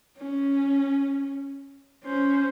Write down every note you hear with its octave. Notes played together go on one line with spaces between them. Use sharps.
C#4
C#4 C5